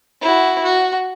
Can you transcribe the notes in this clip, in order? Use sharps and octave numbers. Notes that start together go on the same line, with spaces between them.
E4 F#4
F#4